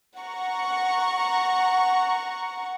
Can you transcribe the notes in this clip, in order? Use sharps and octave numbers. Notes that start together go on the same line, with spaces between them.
F#5 A#5 C#6